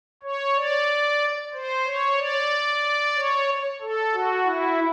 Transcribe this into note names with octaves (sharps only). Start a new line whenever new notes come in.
C#5
D5
C5
C#5
D5
C#5
A4
F#4
E4